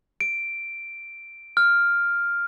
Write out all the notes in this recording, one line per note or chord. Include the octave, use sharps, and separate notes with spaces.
D7
F6